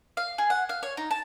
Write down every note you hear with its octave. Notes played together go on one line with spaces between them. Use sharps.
F5
G#4
F#5
F5
C#5
D#4
A5